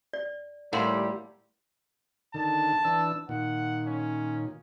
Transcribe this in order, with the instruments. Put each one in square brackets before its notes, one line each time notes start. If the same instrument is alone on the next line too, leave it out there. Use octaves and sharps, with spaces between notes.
[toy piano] D5
[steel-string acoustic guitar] D#2 [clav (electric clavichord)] A2 A#3 E5 [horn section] G3 [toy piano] F#5 C6
[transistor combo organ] D3 D#3 [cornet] A5
[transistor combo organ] E3 D4 E6
[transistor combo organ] A#2 D#3 [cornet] F#5
[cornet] C#4